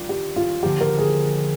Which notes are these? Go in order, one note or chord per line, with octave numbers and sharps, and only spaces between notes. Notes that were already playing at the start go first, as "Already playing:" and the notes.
Already playing: D#3 G3 D4 F4
G4
F4
D3 F3 A#3 G4
A#4
G#4